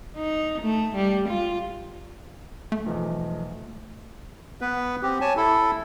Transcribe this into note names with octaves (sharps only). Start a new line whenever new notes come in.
D#4
A3
G3
F4
A3
B1 E2 F3
B3 B4
C4 G4
C#5 G#5 A5
E4 A4